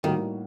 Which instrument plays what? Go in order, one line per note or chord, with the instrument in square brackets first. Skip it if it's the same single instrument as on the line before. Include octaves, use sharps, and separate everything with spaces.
[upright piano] A2 G3 A#3 D#4 F#4 [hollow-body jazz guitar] D#3